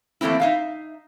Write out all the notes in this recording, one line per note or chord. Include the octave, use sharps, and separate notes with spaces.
E3 A3 A#3 C4 E4
D#4 E5 F5